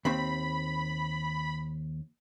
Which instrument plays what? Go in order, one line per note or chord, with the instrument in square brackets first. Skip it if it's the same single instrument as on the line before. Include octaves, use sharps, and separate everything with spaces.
[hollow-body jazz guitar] D#2 C4 [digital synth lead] B5